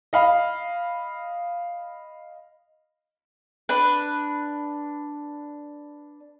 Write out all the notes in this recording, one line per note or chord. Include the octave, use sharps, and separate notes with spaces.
D#5 F5 B5
D4 B4